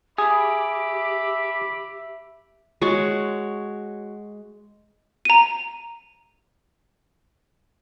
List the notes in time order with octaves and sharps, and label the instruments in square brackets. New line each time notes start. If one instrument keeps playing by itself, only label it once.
[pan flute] G4 [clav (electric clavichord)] G#4 [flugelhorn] E5 [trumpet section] B5 D6
[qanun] G#3 F#4 C#5 C#6
[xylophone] A#5 D#7